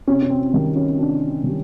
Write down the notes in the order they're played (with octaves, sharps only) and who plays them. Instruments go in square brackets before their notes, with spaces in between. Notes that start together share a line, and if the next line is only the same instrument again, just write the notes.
[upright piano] C3 C#4
C#4
C4
D#3 G3 C4
C#4
C3 D4
D#3 G3